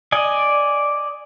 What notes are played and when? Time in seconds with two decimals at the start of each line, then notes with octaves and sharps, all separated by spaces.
0.12 D5 D#5 G#5